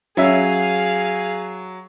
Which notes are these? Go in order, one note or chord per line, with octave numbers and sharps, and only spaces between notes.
F#3 C#4 G#4 E5 F5